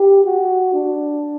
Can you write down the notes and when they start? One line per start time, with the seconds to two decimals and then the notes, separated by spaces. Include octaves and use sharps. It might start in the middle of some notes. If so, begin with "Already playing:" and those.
Already playing: G4
0.25 F#4
0.74 D4